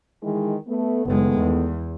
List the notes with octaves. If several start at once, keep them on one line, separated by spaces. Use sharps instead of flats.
D#3 E3 G#3
A3 B3
F#1 D#3 G#3 A3 B3
E2